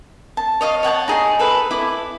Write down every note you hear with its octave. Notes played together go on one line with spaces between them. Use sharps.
A5
C#5 D#5 F5
C#5 F#5 G#5 A5
D#4 G#4
A4 B4
E4 D6